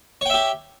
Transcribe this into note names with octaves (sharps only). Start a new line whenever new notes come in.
G4 C#5 E5 G5